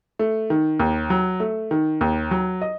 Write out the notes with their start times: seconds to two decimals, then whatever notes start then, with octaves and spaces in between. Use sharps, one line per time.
0.19 A3
0.50 D#3
0.80 D#2
1.10 F#3
1.40 A3
1.71 D#3
2.01 D#2
2.31 F#3
2.62 D#5